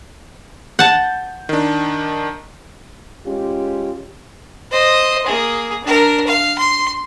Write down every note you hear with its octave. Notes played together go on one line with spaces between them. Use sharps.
F#5 A5 G6
D#3 D4
G#3 C#4 F4 G4
C5 D#5
A#3 G#4
D4 A#4
F5
C6